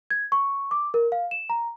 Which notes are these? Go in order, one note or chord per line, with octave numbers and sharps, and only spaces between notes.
G#6
C#6
D6
A#4
F5
E7
A#5